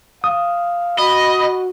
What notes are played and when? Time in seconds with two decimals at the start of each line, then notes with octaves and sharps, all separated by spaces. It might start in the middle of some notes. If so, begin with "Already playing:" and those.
0.24 F5 D#6
0.98 F#4 D#5 B5